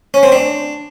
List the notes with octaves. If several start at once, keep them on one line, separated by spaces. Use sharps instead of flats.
C#4
C4
D4